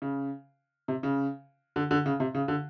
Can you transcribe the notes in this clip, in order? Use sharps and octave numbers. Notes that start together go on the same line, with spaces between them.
C#3
C3
C#3
D3
D3
C#3
C3
C#3
D3